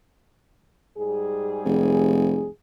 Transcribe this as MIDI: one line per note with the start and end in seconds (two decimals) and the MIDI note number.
0.97 2.47 44
0.97 2.47 55
0.97 2.47 68
1.65 2.48 29